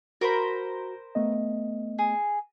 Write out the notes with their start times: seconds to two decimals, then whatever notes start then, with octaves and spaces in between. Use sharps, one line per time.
0.21 F#4 A#4 C5 B5
1.15 A3 B3 D#5
1.99 G#4